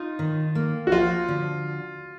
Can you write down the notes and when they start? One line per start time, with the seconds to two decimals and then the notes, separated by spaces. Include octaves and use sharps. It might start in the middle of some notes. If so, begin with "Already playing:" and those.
Already playing: D#4 F4
0.19 D#3
0.55 A#3
0.87 F#4
0.92 F3 F4
1.28 D3